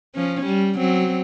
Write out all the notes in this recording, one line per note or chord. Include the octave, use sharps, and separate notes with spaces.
F3 C#4
G3
F#3 C4